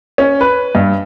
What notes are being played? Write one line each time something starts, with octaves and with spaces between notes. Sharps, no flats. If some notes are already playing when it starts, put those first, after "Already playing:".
C#4
B4
G2